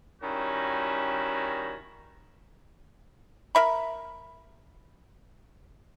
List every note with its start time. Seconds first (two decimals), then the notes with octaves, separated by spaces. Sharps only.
0.22 D#3 G3 C#4 E4 F#4
3.55 A#4 E5 B5